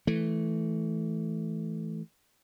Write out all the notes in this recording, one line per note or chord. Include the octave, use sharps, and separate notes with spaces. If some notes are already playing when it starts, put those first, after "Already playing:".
E3 A3